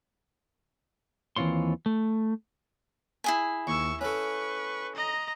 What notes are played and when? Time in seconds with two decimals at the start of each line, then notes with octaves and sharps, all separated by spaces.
1.36 D#2 E3 C4 F4 C#5 C6
1.86 A3
3.24 E4 G#4 G#5
3.67 D#2 C#6 E6
4.01 C#4 A4 B4 C#6
4.95 D#5 A#5